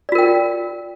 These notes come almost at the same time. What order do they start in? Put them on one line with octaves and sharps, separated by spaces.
D5 F4 A#4 G5